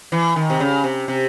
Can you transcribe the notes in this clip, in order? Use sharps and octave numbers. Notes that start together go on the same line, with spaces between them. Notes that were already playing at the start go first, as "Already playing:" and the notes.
E3
D#3
C3
C#3
C3
C3